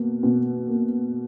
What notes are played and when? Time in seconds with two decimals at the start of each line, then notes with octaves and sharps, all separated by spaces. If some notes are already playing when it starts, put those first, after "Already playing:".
Already playing: B2 A#3
0.23 B2
0.68 A#3